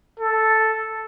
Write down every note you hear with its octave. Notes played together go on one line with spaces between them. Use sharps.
A4